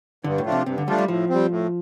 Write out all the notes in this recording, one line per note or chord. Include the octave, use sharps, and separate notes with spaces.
G2 D3
A2
F3 A3 D4 F4
C3
G2 C3
D3
F3 G3 A3 D4 F4
G3
A2 F3
G3 C4
A2